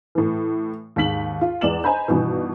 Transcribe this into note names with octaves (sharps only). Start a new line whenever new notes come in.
A2 E3
D#2 G#2 B6 F#7
F4
E2 G#3 D5 E7 F#7
C5 D#5 G#5 A#5 B5 G6
G2 B2 D#3 E3